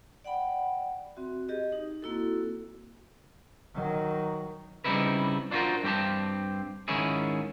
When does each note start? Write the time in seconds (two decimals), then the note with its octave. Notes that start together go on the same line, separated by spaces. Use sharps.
0.24 D5 F#5 G5 B5
1.16 C4 F#4 E5
1.49 G4 G#4 D#5
1.72 D#4
2.02 A#3 C4 E4 F#4 A4
3.75 D#3 F#3
4.84 C#3 G3 C4 D#4 E4 B4
5.51 D4 F4 F#4 A4 A#4 C5
5.83 G2 C4 G4 A5
6.88 G#2 D#3 C#4 E4 G#4